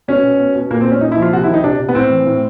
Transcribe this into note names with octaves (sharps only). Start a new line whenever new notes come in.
B2 C#4
B2
B2
B2
A#2 A#3
C4
A#2
C#4
A#2 D#4
E4
F3
F4
C3 F#4
E4
D#3
D#4
C3 D4
C3
B3
A2 C4
E3
A2